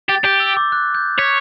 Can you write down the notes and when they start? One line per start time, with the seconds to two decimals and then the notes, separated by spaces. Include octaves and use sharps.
0.09 G4 A6
0.24 G4 G6
0.40 E6
0.57 D6
0.72 F#6
0.95 G6
1.19 C#5 B6